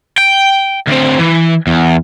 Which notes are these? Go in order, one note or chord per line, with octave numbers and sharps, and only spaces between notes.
G5
D2 C4
E3
E2